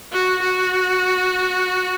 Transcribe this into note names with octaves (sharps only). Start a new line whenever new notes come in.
F#4
F#4